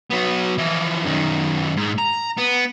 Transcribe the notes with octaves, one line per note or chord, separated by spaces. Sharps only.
F#3 B3
E3 F3
F#2 D#3
G#2
A#5
B3